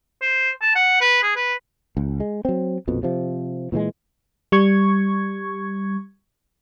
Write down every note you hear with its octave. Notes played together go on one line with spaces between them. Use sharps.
C5
A5
F#5
B4
G#4
B4
C#2
G#3
F#3 C4
A#1 F2 B2
C3 F3
A#2 E3 G3 G#3
G3 C#6 G#6